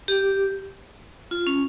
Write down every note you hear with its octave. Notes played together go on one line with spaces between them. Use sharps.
G4
F4
C#4